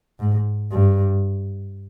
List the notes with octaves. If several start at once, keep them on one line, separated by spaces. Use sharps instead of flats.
G#2
G2